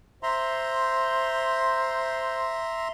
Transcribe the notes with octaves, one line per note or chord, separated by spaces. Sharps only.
C5 E5 A#5 C6